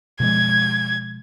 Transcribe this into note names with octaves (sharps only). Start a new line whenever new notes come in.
B2 F3 G#3 G#6